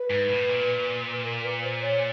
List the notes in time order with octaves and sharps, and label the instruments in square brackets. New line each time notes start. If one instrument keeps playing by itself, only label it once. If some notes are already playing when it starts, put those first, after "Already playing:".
Already playing: [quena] B4
[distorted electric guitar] G#2
A2
A#2
[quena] A#4
B4
C5
C#5